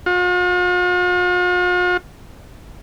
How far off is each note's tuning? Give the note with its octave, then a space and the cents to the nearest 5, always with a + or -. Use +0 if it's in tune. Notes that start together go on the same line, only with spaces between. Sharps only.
F4 +45